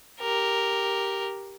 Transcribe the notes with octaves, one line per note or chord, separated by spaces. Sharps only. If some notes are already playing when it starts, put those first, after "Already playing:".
G4 A#4